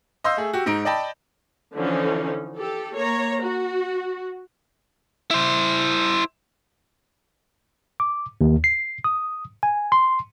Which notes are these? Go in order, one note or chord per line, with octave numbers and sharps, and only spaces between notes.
D#5 F5 C6 E6 G6
A3 G#4
F#4 G4
G#2 D#4 D7
D5 D#5 G5 A5 B5
D3 E3 F3 C#4 D#4
G4 A4
A#3 C#5 A#5
F#4
E4 C5
D6
D#2
C7
D#6
G#5
C6